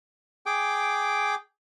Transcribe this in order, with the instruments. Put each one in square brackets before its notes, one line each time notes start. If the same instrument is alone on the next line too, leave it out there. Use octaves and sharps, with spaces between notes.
[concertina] G#4 G5 D6